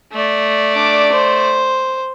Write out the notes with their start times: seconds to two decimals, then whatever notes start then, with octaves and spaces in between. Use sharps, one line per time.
0.12 A3 D5
0.74 D4 D6
1.12 C5